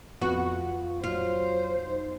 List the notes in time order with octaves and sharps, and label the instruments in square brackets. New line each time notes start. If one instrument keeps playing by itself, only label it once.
[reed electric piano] F2 B3 [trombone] F4 [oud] F#4
[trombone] F#3 [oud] F4 [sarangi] C5
[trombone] D#4